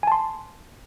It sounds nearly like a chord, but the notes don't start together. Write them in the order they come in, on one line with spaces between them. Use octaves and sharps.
G#5 A5 C6